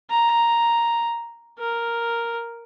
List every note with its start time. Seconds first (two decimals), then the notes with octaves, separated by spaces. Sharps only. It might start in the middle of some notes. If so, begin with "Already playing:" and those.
0.10 A#5
1.59 A#4